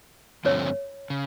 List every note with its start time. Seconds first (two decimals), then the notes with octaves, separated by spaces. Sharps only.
0.45 G2 D3 F3 A3 C4 C#5
1.10 C#3